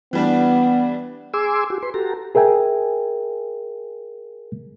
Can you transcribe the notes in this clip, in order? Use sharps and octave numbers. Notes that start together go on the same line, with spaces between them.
E3 G3 B3 D4
G#4 G#5 C6 D6 E6
F#4 G4
B4 C6
F#4 G4 A4 A#5
G#4 A#4 E5 G5 G#5